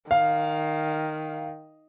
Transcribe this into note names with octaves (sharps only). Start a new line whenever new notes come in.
D#3 F5